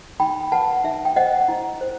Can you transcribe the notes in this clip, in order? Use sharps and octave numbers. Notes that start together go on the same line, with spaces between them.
D#4 G5 B5
B4 F#5 A5
D#4 E5
G5
C5 D#5 F#5
E4
C5